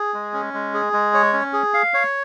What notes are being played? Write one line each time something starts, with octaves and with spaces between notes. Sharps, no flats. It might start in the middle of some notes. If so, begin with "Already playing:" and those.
Already playing: G#4
G#3
C#4
G#3
G#4
G#3
C#5
C#4
G#4
F5
C#5